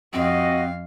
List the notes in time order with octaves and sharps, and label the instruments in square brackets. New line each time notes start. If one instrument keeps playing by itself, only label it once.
[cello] F2 F5 [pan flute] C4 [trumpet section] F#4 D#5